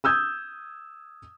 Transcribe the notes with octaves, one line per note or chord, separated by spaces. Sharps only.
D#6 E6 G6 G#6